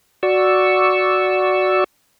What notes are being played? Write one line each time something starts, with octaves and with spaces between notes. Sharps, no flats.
F#4 D5 C#6 E6